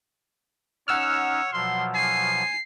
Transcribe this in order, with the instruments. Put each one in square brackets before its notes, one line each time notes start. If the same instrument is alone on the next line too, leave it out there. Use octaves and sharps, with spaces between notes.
[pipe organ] C#4 D#4 [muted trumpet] C#5 [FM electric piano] F#5 E6 F6
[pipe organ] B2 F3 F#3 [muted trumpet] C6
[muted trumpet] G#5 [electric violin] C7